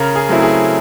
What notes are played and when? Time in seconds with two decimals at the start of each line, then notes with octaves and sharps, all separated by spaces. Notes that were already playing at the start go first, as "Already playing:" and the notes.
Already playing: C#3 A#4
0.16 G#4
0.29 F#3 A3 C4 E4
0.42 G#4